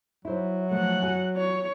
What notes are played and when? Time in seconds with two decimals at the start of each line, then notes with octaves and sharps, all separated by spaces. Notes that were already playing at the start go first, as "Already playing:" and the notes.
0.25 F#3 E4 C5
0.71 F3 A3 A#4 F#5
1.03 F#4 G#5
1.36 C#5